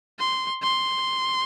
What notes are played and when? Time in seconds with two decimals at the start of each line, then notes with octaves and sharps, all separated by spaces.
0.19 C6
0.63 C6